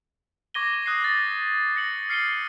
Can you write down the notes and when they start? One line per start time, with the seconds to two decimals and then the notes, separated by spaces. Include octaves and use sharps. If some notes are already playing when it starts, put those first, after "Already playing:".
0.54 C#6 D6 G#6 A#6 D#7 G7
0.86 D#6 F#6 A#6 C7
1.04 A6 A#6
1.76 A#6 C#7 F#7
2.09 F6 C7 C#7 D#7 G7